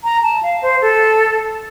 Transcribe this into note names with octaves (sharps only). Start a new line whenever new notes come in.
A#5
A5
F5
C5
A4